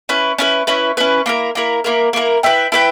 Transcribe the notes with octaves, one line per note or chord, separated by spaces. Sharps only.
C#4 E4 B4
C#4 E4 B4
C#4 E4 B4
C#4 E4 B4
A#3 E4 A#4
A#3 E4 A#4
A#3 E4 A#4
A#3 E4 A#4
E4 B4 E5 G5
E4 B4 E5 G5